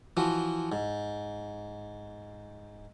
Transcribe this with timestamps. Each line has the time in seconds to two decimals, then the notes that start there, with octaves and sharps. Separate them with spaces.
0.17 E3 F3 F#4
0.72 G#2